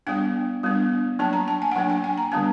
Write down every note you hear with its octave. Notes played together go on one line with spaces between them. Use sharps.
G3 B3 D4 G5
G3 B3 D4
F#3 A#3 D4 A5
A#5
A5
G#5
F#5
F#3 A#3 D4 G5
G5
G#5
A#5
D3 G3 B3 D4 A5